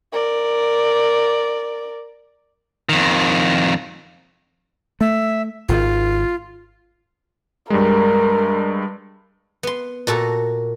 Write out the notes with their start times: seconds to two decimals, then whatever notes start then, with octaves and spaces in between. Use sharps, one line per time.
0.12 A#4 D5
2.89 F2 D#3
5.01 A3 E5
5.69 G#1 D#3 F4
7.70 G2 G3 G#3 A#4
9.63 B3 C6
10.07 A#2 F#4 A4 A#5